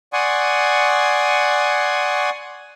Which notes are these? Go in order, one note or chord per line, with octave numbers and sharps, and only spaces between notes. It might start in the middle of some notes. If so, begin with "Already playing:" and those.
D5 F#5 G#5 C6 C#6 D#6